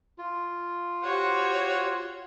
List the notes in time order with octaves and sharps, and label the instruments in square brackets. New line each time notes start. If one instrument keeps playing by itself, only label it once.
[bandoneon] F4
[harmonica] F#4 C5 F#5 [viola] G4 C#5